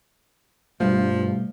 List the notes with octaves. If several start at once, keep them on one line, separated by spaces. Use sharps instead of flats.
G2 B2 F3 G3 A3